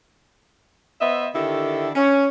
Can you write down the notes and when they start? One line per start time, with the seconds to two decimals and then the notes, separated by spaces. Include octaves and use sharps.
1.01 B3 C5 D#5 E5
1.34 D3 D#3 E4 G4 A4
1.96 C#4